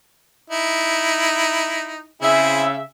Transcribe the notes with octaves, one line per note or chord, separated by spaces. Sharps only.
D#4 E4
C#3 C4 E4 G#4 E5